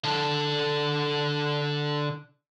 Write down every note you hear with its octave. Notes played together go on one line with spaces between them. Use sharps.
D3 A4